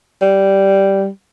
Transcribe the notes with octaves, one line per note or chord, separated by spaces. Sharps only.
G3